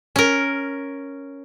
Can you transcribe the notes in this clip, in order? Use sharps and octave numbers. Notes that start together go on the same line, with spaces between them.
C#4 A#4